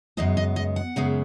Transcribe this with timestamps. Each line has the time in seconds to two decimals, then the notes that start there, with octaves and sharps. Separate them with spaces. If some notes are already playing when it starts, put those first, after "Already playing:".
0.17 F#2 C#3 G#3 B3 D#5
0.37 D#5
0.56 D#5
0.76 F#5
0.96 F#2 C#3 G#3 B3